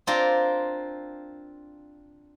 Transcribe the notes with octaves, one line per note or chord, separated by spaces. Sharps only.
C4 D4 F4 A#4